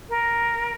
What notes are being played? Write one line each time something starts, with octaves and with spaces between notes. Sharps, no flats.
A#4